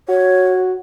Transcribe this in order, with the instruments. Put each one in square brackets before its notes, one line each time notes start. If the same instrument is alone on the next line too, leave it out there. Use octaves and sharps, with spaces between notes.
[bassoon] F#4 [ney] C#5